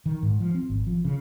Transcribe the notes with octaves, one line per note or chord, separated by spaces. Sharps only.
D#3
G#2
F3
C4
G#1
F3
C#3